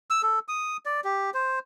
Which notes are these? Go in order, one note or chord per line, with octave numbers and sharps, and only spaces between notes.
E6
A4
D#6
D5
G4
C5